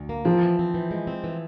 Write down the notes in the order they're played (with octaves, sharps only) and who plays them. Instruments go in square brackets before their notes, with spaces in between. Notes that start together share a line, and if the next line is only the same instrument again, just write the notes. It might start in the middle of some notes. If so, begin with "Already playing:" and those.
Already playing: [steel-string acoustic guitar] D2
A#3
[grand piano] F3 [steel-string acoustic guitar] C4
[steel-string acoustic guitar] E3
C4
E3
G#3
C4
E3